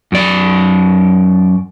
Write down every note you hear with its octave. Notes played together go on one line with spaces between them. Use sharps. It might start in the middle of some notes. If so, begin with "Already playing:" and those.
F#2 D5